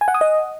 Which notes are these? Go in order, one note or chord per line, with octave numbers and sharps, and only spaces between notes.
G#5
F#5
D#6
D#5